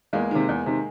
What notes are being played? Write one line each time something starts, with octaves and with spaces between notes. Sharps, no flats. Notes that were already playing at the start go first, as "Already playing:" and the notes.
E2 G#3 A#3
C3 D#3
E2
C3 D#3